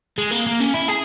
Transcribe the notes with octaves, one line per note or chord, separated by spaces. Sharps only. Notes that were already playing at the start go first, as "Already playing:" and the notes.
G#3
A#3
A#3
C#4
E4
G#4